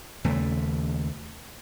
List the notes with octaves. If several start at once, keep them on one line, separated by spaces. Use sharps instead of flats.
D#2 C#3 A3